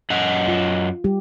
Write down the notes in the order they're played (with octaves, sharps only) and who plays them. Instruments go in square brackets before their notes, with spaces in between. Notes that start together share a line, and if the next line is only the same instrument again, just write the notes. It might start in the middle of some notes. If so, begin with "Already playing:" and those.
[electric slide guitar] F#2 D#5 F#5
[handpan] F4
G3 G4